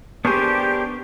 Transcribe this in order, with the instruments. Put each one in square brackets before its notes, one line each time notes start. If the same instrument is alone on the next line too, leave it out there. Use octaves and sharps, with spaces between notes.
[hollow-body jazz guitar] B3 G#4 [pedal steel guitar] D4 A#4 C5 [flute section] G4 [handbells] C#6